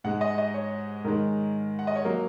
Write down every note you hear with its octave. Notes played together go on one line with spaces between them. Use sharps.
G#2 G#3 F#5
D#5
D#5
C#5
G#2 D#3 G#3 A#4
F#5
D#5
C#5
F#3 A#3 A#4